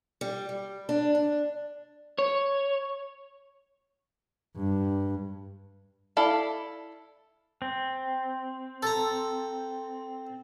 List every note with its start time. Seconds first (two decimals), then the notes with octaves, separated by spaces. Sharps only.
0.21 G3
0.49 G3
0.89 D4
1.15 D4
2.18 C#5
4.57 G2
6.17 E4 A4 D5 F5
7.62 C4
8.83 A4 A#5